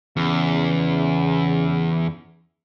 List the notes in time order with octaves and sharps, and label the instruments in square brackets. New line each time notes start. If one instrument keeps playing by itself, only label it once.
[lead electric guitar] E2 [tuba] C#3